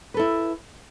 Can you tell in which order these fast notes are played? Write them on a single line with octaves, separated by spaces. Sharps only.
B4 A4 E4